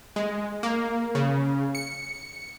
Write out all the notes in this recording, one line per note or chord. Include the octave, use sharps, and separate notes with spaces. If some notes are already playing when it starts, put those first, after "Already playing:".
G#3
A#3
C#3
C#7